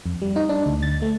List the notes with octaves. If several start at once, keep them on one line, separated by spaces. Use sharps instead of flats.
F2
G3
D#4
D4
D2
A6
A3